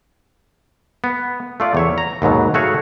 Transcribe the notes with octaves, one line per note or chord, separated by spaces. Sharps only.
B3
A3 F4 D5
E2 C#5 E5
A#5
D#2 G#2 B2 F#3
A3 F#4 G#4 C#5 F5